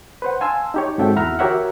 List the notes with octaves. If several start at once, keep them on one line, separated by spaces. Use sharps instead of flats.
B4 C5 F#5
F5 G#5 A5 C6 E6
D#4 G4 C#5
G#2 C4 F#4 A4 E5 G5
E2 E4 E5 F#5 A#5 F6
F#4 G4 A#4 C#5 E5 F#5